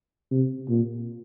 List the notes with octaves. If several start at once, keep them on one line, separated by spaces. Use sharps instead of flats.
C3
A#2